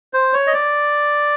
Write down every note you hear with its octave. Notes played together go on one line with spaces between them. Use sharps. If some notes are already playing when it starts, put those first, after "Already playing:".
C5
C#5
D#5
D5